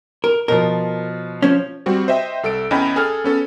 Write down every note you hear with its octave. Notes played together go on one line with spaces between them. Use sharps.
A#4
B2 F3 A#4
F3 C#4
G3 C4 F#4
C5 D#5 E5 G5
C2 A4 E6 D7
E2 C#4 D#5 G5 B5
G#4 A4 G#5 F6
B3 C#4 A4